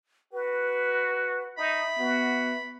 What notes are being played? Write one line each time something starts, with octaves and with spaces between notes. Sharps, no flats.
F#4 B4
D#4 E5 B5
B3 F#4